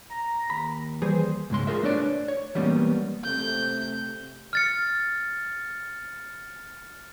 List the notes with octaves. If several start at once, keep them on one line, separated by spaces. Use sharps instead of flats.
A#5
D#2 B5
E3 G3 G#4 C5
C#2 G#2 G#3 C6
F4 G#4 A#4 E5
A3 D4 B4 C#5 D5
C#5
E3 G3 G#3 A#3 B3 C#4
C3 A3 G6
F6 A6 C#7